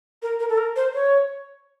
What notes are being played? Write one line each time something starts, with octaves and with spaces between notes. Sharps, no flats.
A#4
A#4
A4
A#4
C5
C#5